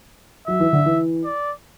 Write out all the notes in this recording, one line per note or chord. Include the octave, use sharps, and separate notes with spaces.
F#3 E5
E3
D3
E3
D5